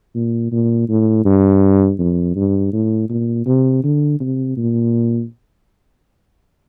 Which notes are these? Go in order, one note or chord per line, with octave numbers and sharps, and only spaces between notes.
A#2
A#2
A2
G2
F2
G2
A2
A#2
C3
D3
C3
A#2